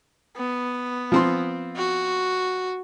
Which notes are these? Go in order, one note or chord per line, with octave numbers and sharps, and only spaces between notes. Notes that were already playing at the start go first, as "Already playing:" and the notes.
B3
F3 C4 C6
F#4